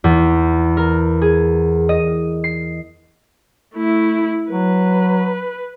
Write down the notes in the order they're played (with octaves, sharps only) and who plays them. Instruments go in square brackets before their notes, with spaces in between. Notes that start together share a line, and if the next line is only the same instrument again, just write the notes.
[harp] E2
A#4
G#4
D#5
C7
[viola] A3 E4
[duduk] F#3 [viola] B4